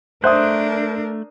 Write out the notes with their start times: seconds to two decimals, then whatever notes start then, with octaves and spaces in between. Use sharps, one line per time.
0.24 A3 D4 A#4 C5 E5 D#6 F#6